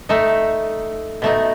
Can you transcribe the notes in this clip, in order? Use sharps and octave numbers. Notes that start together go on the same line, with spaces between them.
A3 D#4 A4
B2 A3 D#4